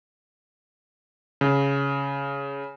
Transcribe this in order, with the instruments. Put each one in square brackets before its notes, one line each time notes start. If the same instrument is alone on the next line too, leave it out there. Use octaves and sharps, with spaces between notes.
[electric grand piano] C#3